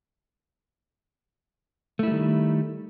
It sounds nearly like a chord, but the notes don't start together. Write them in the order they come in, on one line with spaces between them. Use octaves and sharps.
A3 E4 G3 D#3